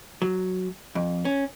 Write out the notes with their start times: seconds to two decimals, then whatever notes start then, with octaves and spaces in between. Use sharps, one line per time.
0.22 F#3
0.95 F2
1.25 C#4